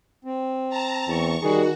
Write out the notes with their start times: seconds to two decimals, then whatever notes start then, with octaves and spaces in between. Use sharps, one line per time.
0.25 C4
0.69 A5 A#5
1.08 E2 C#6
1.43 D#3 G3 F#4 G#4